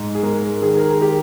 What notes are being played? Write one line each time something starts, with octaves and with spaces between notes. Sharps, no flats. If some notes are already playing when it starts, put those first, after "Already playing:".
Already playing: G#2
G#4
G#3 A#4
D#3 G#4
A#4
G#4
G4